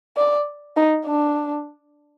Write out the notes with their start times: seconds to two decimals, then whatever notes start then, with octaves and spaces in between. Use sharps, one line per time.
0.17 D5
0.77 D#4
1.06 D4